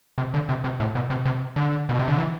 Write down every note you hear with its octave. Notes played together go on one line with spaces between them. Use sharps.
C3
D3
C3
C3
A2
B2
C3
C3
D3
B2
C3
D3
E3